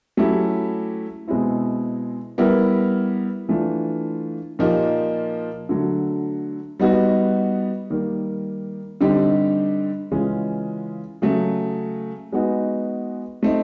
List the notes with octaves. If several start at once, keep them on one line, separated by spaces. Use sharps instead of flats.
F#3 A3 C#4 E4 G4
B2 G#3 C4 E4
G3 B3 E4 G4 A#4
E3 A3 D4 F4
A#2 F3 A#3 D#4 G4
D3 F#3 A3
G3 B3 D#4 F#4
D#3 G3 A#3
D3 G3 C4 D#4 G4
C#3 E3 G#3 C#4 F4
C#3 F#3 A3
G#3 B3 D#4 F#4
A3 C4 D#4